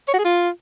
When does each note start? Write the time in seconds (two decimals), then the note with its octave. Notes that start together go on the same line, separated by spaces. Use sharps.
0.08 C#5
0.14 F#4
0.19 G#4
0.25 F4